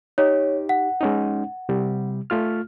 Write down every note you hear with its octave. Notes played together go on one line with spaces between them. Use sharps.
D#4 G4 C#5
F#5
G#3 C#4 D#4
C3 G3
A3 F4 F6